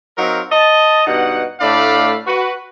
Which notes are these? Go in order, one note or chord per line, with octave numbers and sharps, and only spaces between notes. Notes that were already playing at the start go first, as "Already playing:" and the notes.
F#3 C4 D#4 A#4 F5
D#5 A5
G2 B2 D#4 F#5
A2 A3 D4 D5 F5 B5
F#4 B4